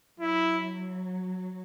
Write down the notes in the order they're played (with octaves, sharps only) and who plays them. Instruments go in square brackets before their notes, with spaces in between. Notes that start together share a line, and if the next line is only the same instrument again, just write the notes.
[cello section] F#3 [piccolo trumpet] E4